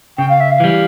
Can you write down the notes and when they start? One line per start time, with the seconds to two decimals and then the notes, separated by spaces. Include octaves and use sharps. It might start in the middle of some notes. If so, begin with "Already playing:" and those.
0.18 C#3 G5
0.29 F5
0.40 E5
0.51 F5
0.60 E3 G3